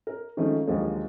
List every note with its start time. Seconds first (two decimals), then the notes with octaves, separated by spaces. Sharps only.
0.07 A#4
0.37 D#3 F3 G#3 A3 C#4
0.67 D#2 D3 F3 F#3 G#3 A#3